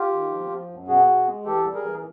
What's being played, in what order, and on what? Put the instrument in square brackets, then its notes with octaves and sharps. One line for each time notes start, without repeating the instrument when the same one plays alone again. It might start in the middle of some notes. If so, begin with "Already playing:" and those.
Already playing: [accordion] F4 G4
D#3
F3
F3
F#2
B2 F#4 G#4
B2
G#3
E3 G4 A4
G3
G#4 A#4
E3